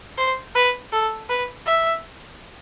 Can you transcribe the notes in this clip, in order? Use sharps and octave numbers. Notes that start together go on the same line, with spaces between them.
C5
B4
A4
B4
E5